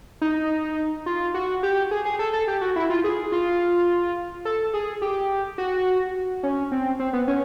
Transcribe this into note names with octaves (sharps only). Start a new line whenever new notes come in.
D#4
F4
F#4
G4
G#4
G#4
A4
A4
G4
F#4
E4
F4
G#4
F4
A4
G#4
G4
F#4
C#4
C4
C4
B3
C#4